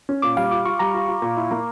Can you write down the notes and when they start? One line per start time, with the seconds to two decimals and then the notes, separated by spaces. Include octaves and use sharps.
0.09 C#4
0.22 A#2 D6
0.37 G3 F5
0.51 F4 D6
0.65 F4 C#6
0.79 G3 A#5
0.94 F4
1.08 F4
1.22 A#2
1.37 E4
1.51 A#3